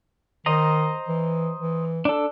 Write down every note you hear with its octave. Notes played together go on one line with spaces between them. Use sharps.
D#3 C5 D#5 A#5
E3
E3
D4 A4